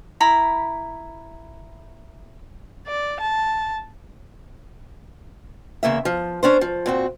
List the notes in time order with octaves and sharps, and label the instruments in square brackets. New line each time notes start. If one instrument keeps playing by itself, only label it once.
[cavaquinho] E4 A#5 B5
[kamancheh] D5
A5
[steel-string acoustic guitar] E2 C#3 A#3 E5
F3
C#4 D4 C5
F3
A#2 C4 F#4